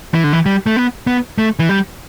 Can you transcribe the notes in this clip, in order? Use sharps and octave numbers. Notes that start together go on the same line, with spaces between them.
E3
D3
E3
G3
A3
B3
B3
A3
E3
G3